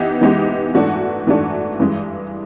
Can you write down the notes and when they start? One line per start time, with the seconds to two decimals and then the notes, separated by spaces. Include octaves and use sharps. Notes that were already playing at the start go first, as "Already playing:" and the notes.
Already playing: E3 B3 D#4 G4
0.21 E3 G#3 B3 D#4 G4
0.74 G#2 E3 A3 D4 F#4
1.27 G#2 E3 A3 D4 F#4
1.79 G2 E3 G#3